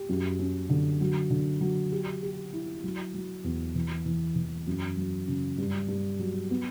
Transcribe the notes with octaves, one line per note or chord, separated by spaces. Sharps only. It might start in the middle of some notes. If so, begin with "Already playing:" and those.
Already playing: G4
F#2
C#4
D3
F#3
D3
F#3
G4
G4
E4
F#3
F#3
E2
E3
E3
E3
F#2
F#3
C#3
G2
G2
F#3
B3